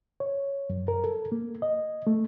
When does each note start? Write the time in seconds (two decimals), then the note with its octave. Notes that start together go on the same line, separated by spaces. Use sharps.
0.20 C#5
0.70 F#2
0.88 A#4
1.04 A4
1.32 A#3
1.62 D#5
2.07 A3